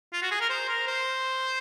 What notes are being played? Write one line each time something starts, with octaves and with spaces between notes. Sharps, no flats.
F4
F#4
G#4
A#4
C5
A#4
C5